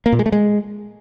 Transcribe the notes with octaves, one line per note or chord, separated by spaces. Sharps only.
A#3
A#2
G#3
A3
G#3